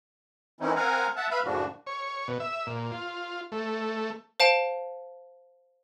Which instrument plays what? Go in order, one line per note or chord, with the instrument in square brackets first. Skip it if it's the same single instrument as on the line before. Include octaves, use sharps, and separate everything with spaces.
[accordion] D#3 E3 C4 C#4 D#4 E4
C4 A#4 F5 F#5 G#5 A#5
E5 F#5 A5
B4 E5 F5 B5
F#2 A2 C#3 F3 D4 F#4
[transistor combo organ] C#5
B2
E5
A#2
F4
A3
[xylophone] C5 F5 A5 D7